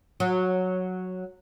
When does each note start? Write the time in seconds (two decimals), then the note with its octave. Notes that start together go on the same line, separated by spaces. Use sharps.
0.20 F#3